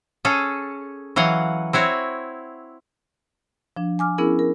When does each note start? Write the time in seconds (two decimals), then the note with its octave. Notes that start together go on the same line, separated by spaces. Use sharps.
0.25 C#4 G#4 A4
1.16 E3 F#3 F5 F#5
1.73 C4 E4 F#4 C#5
3.77 F3 D4
3.99 G#5 D6 F6
4.18 B3 C#4 E4 G#4 A#4
4.39 A#4